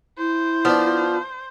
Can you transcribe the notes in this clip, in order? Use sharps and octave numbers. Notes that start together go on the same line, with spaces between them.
E4 C5
F3 B3 D4